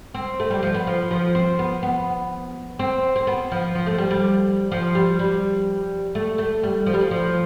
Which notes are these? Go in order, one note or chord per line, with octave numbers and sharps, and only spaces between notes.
C4
A3
G3
F3
B3
F3
F3
C4
B3
B3
C4
C4
B3
F3
F3
A3
G3
G3
F3
G3
G3
A3
A3
G3
F3
G3
F3
F3